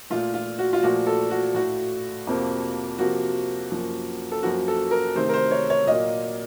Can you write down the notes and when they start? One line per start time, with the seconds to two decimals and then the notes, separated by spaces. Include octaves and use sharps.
0.10 A#2 A3 F4
0.34 F4
0.58 F#4
0.73 F4
0.83 A#2 F3 A3 F#4
1.07 A4
1.31 F#4
1.54 A2 A3 F#4
2.27 F2 C3 F3 A#3
2.98 C3 F3 A#3 F#4
3.71 F#2 F3 A#3
4.32 A4
4.43 F#2 F3 A#3 F#4
4.68 A4
4.91 A#4
5.15 C3 D#3 A3 C5
5.29 A#4
5.34 C5
5.51 C#5
5.70 C#5
5.87 A#2 F#3 A#3 D#5